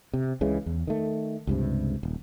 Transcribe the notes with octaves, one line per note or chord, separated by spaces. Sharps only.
C3
C#2 C#3 E3 G#3
E2
D#3 A3
C#2 G2 C3
D#1